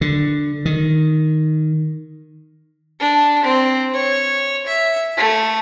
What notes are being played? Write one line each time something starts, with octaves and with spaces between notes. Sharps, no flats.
D3
D#3
D4
C4
C#5
E5
A3